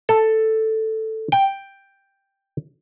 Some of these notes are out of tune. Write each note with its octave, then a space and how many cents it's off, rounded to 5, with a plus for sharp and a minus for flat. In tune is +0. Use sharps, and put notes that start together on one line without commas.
A4 +5
G5 +5